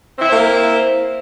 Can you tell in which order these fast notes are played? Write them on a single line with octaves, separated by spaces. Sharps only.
C4 E4 E5 C5 A#3